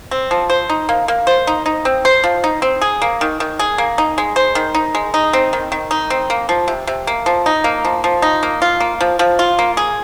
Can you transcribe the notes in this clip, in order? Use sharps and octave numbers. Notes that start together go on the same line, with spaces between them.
C4
F3
C5
D#4
A#3
A#3
C5
D#4
D#4
C4
C5
F3
D#4
C4
G#4
A#3
D#3
D#3
G#4
A#3
D#4
G#3
C5
D#3
D#4
G#3
D#4
C4
D#3
D#3
D#4
C4
A#3
F3
C3
C3
A#3
F3
D#4
A#3
F3
F3
D#4
A#3
F4
A#3
F3
F3
F4
A#3
G#4